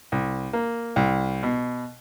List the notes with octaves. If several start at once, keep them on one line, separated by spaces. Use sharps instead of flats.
C2
A#3
C2
B2